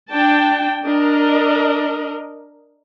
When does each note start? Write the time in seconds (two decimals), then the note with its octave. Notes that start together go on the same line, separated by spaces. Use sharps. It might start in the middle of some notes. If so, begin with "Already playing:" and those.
0.10 D4 G5 A5
0.84 D4 A#4 D#5